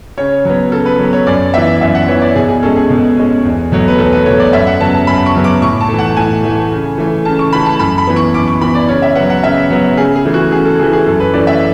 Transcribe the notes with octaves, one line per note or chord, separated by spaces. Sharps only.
C#3 C#5
F#3 B3
C#3 A4
B4
F#3 B3
C#5
F#2 D5
E3 B3 E5
F#2 E5
F#5
E3 B3 C#5
D5
B2 G#4
G#4
G#3 C#4 A4
G#4
B2
G#3 C#4
E2
B2 F#3 A3
B4
E2 A4
B4
B2 F#3 A3 C#5
D5
F#2 E5
F#5
C#3 F#3 B3 A5
A5
F#2 B5
C#6
C#3 F#3 B3
D6
A2 C#6
A5
E3 A3
F#5
A2 G#5
E3 A3
C#3
E3 A3
C#3 A5
C#6
E3 A3 B5
A5
F#2 B5
B5
E3 B3
C#6
F#2 D6
C#6
E3 B3 B5
D5
C#3 C#5
E5
F#3 B3 F#5
F#5
C#3 E5
F#3 B3
C#3 G#4
G#4
E3 A3
F#4
C#3 G#4
A4
E3 A3 G#4
G#4
F#2 A4
B4
E3 A3 C#4 D5
E5